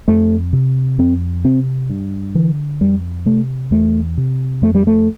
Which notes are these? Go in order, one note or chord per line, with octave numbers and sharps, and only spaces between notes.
F2 A3
C3
F2 C4
C3 C4
G2
D3 E3
F2 G3
C3 A3
E2 A3
C3
F2 A3
G3
A3